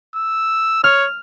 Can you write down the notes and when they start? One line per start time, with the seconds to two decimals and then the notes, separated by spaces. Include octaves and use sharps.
0.16 E6
0.84 C#5 F6